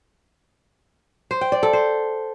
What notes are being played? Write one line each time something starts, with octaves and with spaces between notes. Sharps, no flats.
C5
G5
D5
A4
C5